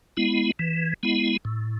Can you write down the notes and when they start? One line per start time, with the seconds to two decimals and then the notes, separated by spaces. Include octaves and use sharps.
0.17 G#3 B3 E4
0.59 E3
1.03 G#3 B3 E4
1.45 A2